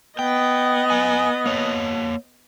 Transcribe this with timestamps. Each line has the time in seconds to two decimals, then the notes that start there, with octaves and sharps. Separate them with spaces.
0.19 B3 D#5 G5
0.90 F#5 G#5
1.46 A#3 C#5 F#5